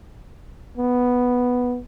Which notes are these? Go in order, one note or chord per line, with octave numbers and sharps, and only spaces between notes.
B3